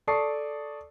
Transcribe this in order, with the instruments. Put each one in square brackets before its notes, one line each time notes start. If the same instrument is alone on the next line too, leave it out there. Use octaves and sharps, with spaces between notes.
[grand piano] A4 D5 A5 C#6 D#6 C7